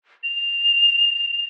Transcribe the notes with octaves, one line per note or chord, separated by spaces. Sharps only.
F7